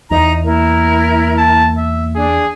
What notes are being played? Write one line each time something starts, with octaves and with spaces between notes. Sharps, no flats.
E2 D#4 A#5
A#3 E4 A#4
A5
E5
D4 G#4